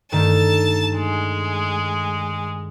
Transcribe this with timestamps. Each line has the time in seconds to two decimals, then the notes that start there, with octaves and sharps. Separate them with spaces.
0.12 G2 D#3 A3 A5
0.97 G#3